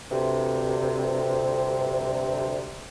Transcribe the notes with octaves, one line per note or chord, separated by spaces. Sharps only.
D2 G2 C3